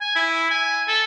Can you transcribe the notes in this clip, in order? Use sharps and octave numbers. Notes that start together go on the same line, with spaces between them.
G#5
E4
G#5
A4